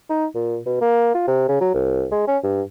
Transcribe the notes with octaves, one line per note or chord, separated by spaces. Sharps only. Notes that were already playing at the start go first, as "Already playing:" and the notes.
D#4
A#2
B2
A#3
F4
C3
C#3
F#3
C2
G#3
C#4
G2